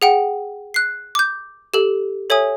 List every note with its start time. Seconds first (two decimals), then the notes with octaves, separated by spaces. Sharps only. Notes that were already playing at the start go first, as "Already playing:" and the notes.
0.02 G#4 F#5 G5
0.74 F#6 C7
1.15 D6 G6
1.74 G4 A4
2.30 A4 C#5 E5 G#5 D#6